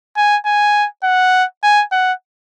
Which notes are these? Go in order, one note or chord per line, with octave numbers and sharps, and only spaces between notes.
G#5
G#5
F#5
G#5
F#5